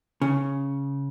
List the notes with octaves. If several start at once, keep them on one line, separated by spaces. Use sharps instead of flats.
C#3